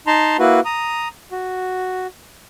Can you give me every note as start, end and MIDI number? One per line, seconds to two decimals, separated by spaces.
0.07 0.37 63
0.07 0.37 81
0.07 0.37 82
0.07 0.37 84
0.39 0.60 58
0.39 0.60 64
0.39 0.60 66
0.39 0.60 71
0.65 1.08 82
0.65 1.08 87
1.32 2.07 66